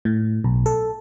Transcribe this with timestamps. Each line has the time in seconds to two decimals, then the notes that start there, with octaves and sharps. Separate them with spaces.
0.05 A2
0.44 B1
0.66 A4